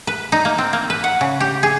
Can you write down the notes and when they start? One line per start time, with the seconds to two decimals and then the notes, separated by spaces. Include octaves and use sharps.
0.07 B4
0.32 D#4
0.45 A#3
0.58 C4
0.73 A#3
0.90 B4
1.04 F#5
1.21 C#3
1.40 G4
1.63 G#4